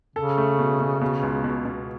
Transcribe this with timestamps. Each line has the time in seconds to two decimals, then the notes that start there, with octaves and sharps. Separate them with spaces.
0.16 C#3 A4
0.38 A3
0.59 B2
0.80 B2
1.01 B2
1.23 C#2
1.44 B2
1.65 B2